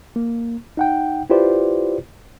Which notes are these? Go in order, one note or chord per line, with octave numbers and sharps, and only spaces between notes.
A#3
D#4 F#5 G5
E4 F4 G4 B4 C5 D5